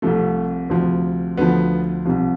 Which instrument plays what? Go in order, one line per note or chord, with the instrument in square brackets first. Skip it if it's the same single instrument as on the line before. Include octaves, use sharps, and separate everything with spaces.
[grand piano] C2 C3 F3 A3
D2 C3 F3
D2 D3 F3 B3
C2 C3 F3